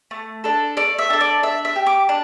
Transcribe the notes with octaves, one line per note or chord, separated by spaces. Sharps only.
A3
D4 A4
A3 D5
E5
D4 A4
D5
D4 E5
E5
G4
D6
D4